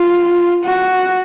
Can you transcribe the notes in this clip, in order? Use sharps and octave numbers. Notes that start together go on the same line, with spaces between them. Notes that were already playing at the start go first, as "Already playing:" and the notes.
Already playing: F4
F#4